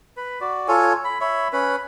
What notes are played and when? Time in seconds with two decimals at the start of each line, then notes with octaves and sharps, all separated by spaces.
0.17 B4
0.41 F#4 D5
0.68 F4 A4 C#5 G#5
1.05 B5
1.21 C#5 E5 B5
1.53 C#4 B4